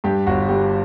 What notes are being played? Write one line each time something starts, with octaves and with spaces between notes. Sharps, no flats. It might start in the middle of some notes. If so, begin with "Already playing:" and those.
G2 G4
G1 F#4
G3 G4